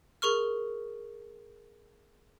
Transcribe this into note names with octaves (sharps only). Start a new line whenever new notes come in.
G#4 A#4 C#6 F6